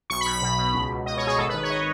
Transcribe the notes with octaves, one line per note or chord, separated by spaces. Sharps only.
B1 C#6
B5
B1
B5
B2
B2
C#2
C#2
B2 D#5
C#5
B2
G#4
G#1 A4
B4
D#3
C#5
D#5